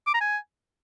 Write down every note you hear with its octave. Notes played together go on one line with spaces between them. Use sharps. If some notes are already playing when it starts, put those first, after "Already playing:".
D6
A#5
G#5